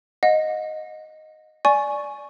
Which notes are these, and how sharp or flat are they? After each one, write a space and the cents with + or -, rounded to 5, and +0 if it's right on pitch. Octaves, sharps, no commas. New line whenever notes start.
D#5 +0 F#5 -35
D5 +0 G#5 +15 C#6 +0